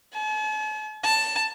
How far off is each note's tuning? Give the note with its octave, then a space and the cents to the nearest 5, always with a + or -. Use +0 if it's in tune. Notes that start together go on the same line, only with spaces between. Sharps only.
A5 -45
A5 +10